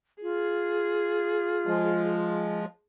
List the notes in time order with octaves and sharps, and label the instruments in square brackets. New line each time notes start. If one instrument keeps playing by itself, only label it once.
[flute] F4 [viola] G#4
[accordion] F3 G#3